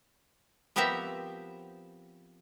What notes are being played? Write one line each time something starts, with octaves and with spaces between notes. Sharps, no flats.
F3 B3 C4 G4 A#4 E5